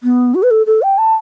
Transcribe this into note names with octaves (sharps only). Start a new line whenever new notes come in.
B3
F#4
B4
A4
A4
G5
A5